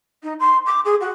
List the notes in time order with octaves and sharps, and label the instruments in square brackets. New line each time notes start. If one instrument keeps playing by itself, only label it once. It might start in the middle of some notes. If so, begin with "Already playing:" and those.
[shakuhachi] D#4
C6
D6
G#4
F#4